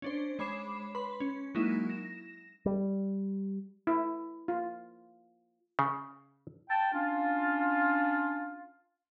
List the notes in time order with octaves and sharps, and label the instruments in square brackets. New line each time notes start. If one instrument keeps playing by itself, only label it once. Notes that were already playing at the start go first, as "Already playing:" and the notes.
[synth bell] C#4 D4 C5
G#3 C#5 B5 D6 C7 E7
B4 B5 C6
C#4
F#3 G#3 A#3 D#4 E4
A#6 E7
[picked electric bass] G3
[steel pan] E4
F4
[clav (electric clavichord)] C#3
[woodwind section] G5 A5
C#4 D4 F4